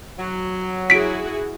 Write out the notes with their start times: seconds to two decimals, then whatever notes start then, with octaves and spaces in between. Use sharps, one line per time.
0.19 F#3
0.90 E4 F#4 G#4 B6 D7